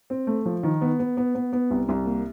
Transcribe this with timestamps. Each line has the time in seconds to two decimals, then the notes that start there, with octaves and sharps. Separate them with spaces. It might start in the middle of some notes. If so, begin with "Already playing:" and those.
0.10 C4
0.27 A3
0.46 F3
0.63 D#3
0.81 B3
0.99 B3
1.17 B3
1.35 B3
1.53 B3
1.71 C2
1.89 C2
2.06 A#3